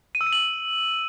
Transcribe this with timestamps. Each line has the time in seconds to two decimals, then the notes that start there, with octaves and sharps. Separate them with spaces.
0.15 D#7
0.21 E6
0.27 D#7
0.32 F#7